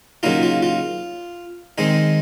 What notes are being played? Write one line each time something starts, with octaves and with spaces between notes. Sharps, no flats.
C#3 F#3 A#3 D#4 F4
F4
F4
D#3 G#3 C4 D#4